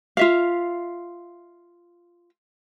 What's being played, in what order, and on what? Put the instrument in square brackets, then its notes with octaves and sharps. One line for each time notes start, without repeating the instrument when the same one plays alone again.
[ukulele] F4 E5 F5